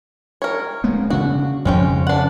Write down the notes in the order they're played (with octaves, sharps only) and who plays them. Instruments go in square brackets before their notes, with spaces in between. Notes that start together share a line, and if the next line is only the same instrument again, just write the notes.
[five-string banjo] A#4 C#5
[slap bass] G#3 A#3 B3
[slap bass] C#3 D4 [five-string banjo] F#4
[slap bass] F2 C#3 F3 [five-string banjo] G#3 C#4 G5
[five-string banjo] D4 F#5